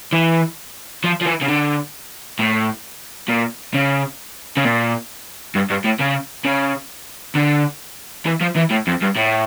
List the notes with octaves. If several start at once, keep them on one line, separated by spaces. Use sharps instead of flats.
E3
F3
F3
E3
C#3
D3
A2
A#2
C#3
C#3
A#2
G2
G2
A2
C#3
C#3
D3
E3
F3
E3
A2
F2
G2
A2